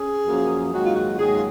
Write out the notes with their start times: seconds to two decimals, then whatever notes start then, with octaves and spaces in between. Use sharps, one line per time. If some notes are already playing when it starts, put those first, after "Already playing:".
Already playing: C#4 G#4
0.27 F#2 F3 A#3 C#4
0.72 G#2 D#3 F#3 A#3 D#4 F#4
0.85 F4
0.94 F#4
1.18 G#2 D#3 F#3 A#3 D#4 G#4
1.35 F4